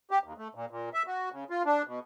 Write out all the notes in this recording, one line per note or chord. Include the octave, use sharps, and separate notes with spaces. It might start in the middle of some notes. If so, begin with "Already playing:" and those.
G4
D#2
A3
A#2
A#2
E5
F#4
C#3
F4
D4
B2